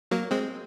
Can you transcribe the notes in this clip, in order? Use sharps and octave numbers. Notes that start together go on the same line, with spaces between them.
F#3 A#3
G#3 C4